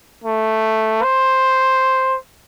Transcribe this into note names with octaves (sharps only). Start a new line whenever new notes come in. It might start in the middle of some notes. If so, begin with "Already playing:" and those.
A3
C5